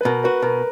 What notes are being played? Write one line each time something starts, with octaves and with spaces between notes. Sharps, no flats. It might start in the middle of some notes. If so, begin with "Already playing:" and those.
B4
B2 A#4
F#4 B4
B2 A#4